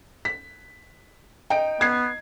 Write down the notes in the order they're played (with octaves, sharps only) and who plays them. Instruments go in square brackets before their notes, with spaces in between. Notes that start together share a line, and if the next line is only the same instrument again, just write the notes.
[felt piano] B6
[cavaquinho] D#4 [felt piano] G5 D7
[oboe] B3 [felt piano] G#6 C7